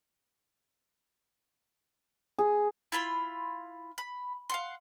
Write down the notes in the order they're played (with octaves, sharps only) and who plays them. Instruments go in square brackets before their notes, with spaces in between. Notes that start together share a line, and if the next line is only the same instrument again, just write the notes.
[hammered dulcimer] G#4
[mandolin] E4 F4 B5 C6
B5
F5 F#5 C6